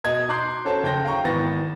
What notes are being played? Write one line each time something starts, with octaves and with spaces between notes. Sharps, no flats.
B2 D#5 G#6
A#5 C6 D6 F#6 G6 C7
C#4 F#4 A4 C5 C#5 A5
F#1 G5 G6 A#6
F5 G5 A#5 C#6
G#1 E3 B3 A6 A#6